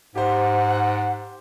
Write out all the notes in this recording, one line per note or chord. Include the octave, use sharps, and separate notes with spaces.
G#2 G4 C5 F#5